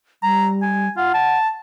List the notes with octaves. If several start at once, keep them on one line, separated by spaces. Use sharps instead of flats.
G3 A#5
G#5
F4 F#5
A5